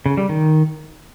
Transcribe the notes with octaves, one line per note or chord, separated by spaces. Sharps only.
C#3
G3
D#3